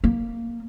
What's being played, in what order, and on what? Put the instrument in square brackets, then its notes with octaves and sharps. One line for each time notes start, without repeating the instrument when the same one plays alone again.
[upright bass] A#3